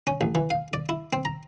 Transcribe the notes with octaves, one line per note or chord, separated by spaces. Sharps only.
C#4
A1
E3
F5
D5
E4
C4
A#5